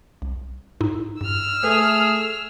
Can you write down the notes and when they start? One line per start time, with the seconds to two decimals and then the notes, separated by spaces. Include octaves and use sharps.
0.22 C2
0.81 G#2 D#4 E4
1.21 G2 E6 F6
1.64 A3 G#4 B4